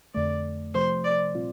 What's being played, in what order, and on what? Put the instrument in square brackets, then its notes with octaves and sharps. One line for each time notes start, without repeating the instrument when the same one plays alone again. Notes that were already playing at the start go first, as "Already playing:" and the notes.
[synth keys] F2 D3 A3 [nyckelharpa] D5
[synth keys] C3 F3 A3 [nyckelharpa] C5
[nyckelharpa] D5
[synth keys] A#2 G3 C4 F4